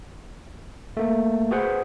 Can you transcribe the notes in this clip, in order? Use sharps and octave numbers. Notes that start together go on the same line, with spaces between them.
A3 A#3
F#4 G#4 B4 C5 F#5